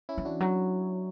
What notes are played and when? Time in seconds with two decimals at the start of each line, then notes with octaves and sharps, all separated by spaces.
0.09 C#4 E4
0.18 E3
0.25 D4 F#4
0.40 F#3